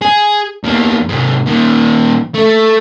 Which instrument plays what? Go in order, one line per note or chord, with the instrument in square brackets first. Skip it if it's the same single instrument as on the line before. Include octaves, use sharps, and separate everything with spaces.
[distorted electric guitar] G#4
E2 A#3
G#2 C3
A#2 D#3
A3